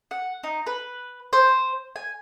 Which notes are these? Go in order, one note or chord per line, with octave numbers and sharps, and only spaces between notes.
F#5
D#4
B4
C5
G#5